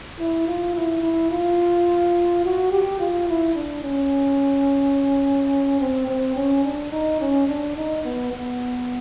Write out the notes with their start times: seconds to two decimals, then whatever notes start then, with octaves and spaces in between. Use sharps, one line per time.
0.19 E4
0.48 F4
0.76 E4
1.03 E4
1.31 F4
2.44 F#4
2.71 G4
3.00 F4
3.28 E4
3.55 D4
3.84 C#4
5.80 C4
6.08 C4
6.36 C#4
6.65 D4
6.92 D#4
7.20 C#4
7.48 D4
7.76 D#4
8.04 B3
8.32 B3